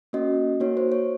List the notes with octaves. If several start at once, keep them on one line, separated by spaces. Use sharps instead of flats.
A#3 C#4 F#4 D#5
A#3 D#4 F#4 C#5
C5
C#5